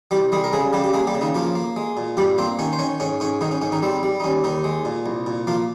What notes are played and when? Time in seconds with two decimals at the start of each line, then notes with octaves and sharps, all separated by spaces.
0.11 C2 G3 G4
0.32 G3 G#3 G#4
0.44 A#4
0.53 C#3 G#3 G#4
0.73 C#3 G3 G4
0.84 G4
0.93 G#3 A#3 G#4
1.07 G3 G4
1.15 C#3
1.21 D#3 D#4
1.35 F3 A#3 F4
1.55 A#3
1.76 G#3
1.97 A#2
2.17 G2 G3 G4
2.38 A#3 C4 C5
2.59 D#3 C#4 C#5
2.73 C5
2.79 D#3 C#4 C#5
3.00 G#2 C#4 C#5
3.20 G#2 C#4 C#5
3.41 G#2 D#3 D#4
3.51 C#4
3.62 G#2 C#4
3.72 D#3 D#4
3.82 G3 C4
4.03 G3
4.20 D#4
4.24 D#2 C#4
4.44 D#2 D#3 D#4
4.64 G#3
4.85 A#2
5.06 C2
5.26 A#2
5.47 F3 A#3 F4